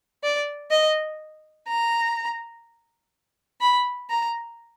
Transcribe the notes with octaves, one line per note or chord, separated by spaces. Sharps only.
D5
D#5
A#5
B5
A#5